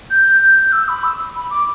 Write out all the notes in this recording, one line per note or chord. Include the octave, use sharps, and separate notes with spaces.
G6
G6
E6
B5
E6
B5
D6